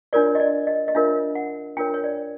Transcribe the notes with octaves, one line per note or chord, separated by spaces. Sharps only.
D4 F4 A#4 C#5 D5
D#5
D5
D#5
D#5
D4 F4 A#4 C#5 E5
F#5
D4 F4 A#4 C#5 G5
C#5
D5